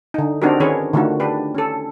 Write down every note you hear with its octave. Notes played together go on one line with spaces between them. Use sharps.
D3 D#4
C4 D4 D#4 F#4 G4 A#4
D#3 C#4 G#4 B4 C#5
D3 D#3 A3 F4 F#4
D4 G4 B4
C#4 A4